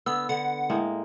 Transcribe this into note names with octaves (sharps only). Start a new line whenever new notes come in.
D3 B3 E6
D3 F#5
A2 G#3 A#3